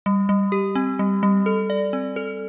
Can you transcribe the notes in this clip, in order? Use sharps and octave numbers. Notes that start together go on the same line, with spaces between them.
G3
G3
G4
C4
G3
G3
A4
D5
C4
A4